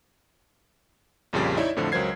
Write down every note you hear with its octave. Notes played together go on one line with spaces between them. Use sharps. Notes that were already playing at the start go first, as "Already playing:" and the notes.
A#1 F2 A#2 C#3 G3 D5
D#4 E4 C#5 D5 E5
F2 A2 D3 F3
C#2 F#3 A#4 C5 G#6 C7